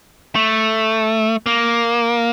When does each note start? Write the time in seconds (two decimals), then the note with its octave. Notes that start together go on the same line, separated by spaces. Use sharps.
0.35 A3
1.46 A#3